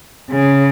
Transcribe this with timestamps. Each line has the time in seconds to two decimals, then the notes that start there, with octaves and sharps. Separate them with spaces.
0.31 C#3